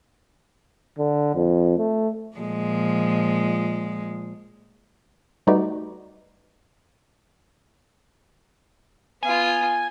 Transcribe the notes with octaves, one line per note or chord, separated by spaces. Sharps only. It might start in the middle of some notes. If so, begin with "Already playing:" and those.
D3
F2
A3
A#2 F3 G#3
G3 A3 D#4 F#4 B4 D5
B3 F4 G#5